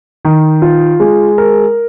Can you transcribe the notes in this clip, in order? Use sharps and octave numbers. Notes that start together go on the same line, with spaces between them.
D#3
F4
G#3
A#4